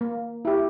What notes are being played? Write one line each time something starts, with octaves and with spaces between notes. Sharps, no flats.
A#3
E4 G4